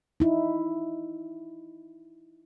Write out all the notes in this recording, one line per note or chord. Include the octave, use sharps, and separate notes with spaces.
D#4 E4